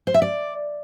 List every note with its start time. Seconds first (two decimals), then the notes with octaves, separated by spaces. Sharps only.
0.07 C5
0.14 E5
0.22 D5